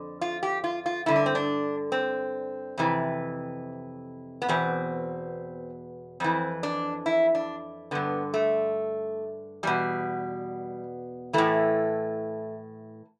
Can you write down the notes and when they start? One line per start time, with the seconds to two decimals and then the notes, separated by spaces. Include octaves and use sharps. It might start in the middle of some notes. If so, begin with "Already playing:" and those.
Already playing: F2 D3
0.21 F4
0.43 G4
0.64 F4
0.86 F4
1.06 G2 D3 E4
1.16 D4
1.26 C4
1.35 D4
1.92 C4
2.78 F2 C3 E3
4.42 B3
4.48 E2 B2 C4
6.20 F2 E3 C4
6.63 D4
7.06 E4
7.35 D4
7.91 G2 D3 B3
8.34 A3
9.63 E2 B2 G3
11.33 A2 E3 A3